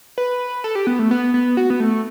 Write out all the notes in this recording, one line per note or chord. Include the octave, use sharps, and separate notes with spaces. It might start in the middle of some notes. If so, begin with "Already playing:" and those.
B4
A4
G4
B3
A3
B3
B3
F#4
B3
A3